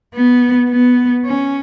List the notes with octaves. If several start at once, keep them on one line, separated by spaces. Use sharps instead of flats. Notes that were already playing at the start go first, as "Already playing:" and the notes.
B3
B3
C#4